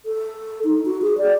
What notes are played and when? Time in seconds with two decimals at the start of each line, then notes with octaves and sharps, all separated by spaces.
0.06 A4
0.64 D#4
0.86 F#4
1.02 G#4
1.18 D5